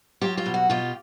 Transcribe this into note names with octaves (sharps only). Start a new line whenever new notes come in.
F#3 F4 G4
F4 G4
B2
F#4
B2 F4 G4